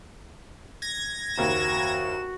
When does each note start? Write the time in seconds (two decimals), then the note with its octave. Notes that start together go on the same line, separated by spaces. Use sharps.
0.82 G#6 A#6
1.38 F#1 D#2 F#4 E7